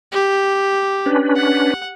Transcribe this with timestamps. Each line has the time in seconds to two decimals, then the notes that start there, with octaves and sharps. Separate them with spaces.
0.12 G4
1.06 C#4 D4 B4
1.36 F#5